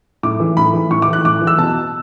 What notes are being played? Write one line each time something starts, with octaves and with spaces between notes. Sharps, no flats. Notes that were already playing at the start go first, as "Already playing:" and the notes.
A2 D6
E3
A2 B5
E3
A2 C#6
D6
E3 F#6
A2 D6
E3
E6
B2 A5